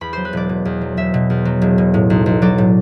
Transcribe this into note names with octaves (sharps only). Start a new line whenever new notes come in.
E2 B5
F#3 C5
B4
E1 D5
B2
E2
F#3
E1 E5
B2
E2
F#3
E1
B2
A2
B1
B1
F#3 D5
A2